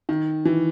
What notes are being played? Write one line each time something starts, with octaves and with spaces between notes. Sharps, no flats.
D#3
E3